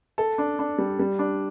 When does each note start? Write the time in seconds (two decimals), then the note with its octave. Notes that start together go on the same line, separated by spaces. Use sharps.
0.18 A4
0.38 D4
0.59 D4
0.78 G3
0.99 G3
1.19 D4